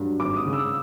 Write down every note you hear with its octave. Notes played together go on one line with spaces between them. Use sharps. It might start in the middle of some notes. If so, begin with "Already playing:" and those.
Already playing: G2 F#3
G#1 D6
D#6
C#3
E6